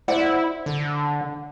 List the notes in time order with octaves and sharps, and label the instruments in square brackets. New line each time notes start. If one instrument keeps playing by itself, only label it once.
[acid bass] E4 [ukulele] C5 D5 F#5
[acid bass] D3